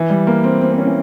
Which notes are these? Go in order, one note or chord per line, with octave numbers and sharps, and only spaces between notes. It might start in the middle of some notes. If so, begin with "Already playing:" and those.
Already playing: E3
G3
A#3
C4
C4
C4
C#4
E3